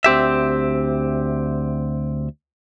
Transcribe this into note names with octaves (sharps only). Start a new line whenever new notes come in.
D2 C4 G4 E5